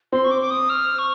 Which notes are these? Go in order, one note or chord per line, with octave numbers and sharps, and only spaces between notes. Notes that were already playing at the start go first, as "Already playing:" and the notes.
C4 C6
C#6
D6
D6
D#6
F6
C#6